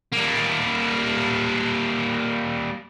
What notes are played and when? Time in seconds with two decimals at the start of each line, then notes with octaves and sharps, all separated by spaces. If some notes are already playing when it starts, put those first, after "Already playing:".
0.13 G3 A#3